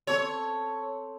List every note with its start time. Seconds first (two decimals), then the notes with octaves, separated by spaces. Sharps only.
0.07 C4 A4 C#5 E6